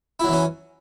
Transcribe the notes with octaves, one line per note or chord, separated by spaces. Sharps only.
E3 F#3 C#4 E4